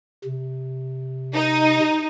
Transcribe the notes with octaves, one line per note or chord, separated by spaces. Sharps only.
C3
D#4